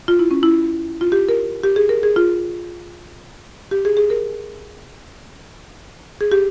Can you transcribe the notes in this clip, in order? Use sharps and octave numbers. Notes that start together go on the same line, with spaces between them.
F4
E4
C#4
E4
F4
G4
A#4
G4
G#4
A#4
G#4
F4
G4
G#4
G#4
A#4
G#4
G4